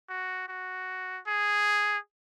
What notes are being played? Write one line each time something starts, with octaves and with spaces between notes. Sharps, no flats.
F#4
F#4
G#4